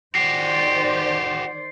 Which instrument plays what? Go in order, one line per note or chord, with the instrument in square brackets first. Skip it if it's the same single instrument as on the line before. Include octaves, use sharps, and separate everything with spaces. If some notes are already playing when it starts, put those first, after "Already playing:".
[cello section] D#3 C5 D5 [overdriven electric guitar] F#4 G4 [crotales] C7